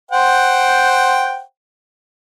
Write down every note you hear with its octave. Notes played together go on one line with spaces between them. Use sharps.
C5 F#5 G5